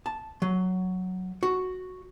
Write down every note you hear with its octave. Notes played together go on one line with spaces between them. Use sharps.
A5
F#3
F#4